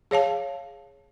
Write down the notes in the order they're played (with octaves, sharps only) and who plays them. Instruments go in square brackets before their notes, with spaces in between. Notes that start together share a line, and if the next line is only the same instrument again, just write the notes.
[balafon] G#4 C#5 F5 A5